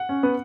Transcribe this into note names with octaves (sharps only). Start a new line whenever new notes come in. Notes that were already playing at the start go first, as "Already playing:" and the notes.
Already playing: F#5
C#4
B3